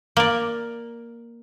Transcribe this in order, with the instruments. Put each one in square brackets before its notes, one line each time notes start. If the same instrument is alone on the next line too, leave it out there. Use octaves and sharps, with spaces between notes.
[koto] A#3 D5